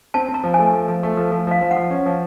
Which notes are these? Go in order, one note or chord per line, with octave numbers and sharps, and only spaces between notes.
C4 A5
C4
A#5
F3
G#5
A3
F3
F3
A3
F3
F3
F3 F5
F3
F#5
F3
C#4
F3